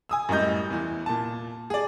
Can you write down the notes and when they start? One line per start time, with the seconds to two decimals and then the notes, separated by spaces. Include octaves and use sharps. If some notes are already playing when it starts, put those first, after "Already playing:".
0.09 G#5 D#6 E6
0.29 F#2 A2 G3 D#5 G6
0.71 E2 E3
1.06 A#2 A5
1.70 G#4 D5